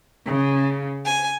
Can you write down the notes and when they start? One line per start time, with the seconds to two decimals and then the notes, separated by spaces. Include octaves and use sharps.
0.24 C#3
1.05 G#5